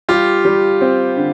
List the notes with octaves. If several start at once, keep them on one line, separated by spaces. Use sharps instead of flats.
G3 F4 G4
G3
C4
D3